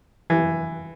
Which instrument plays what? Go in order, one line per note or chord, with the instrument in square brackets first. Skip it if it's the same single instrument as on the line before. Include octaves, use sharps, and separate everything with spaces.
[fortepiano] E3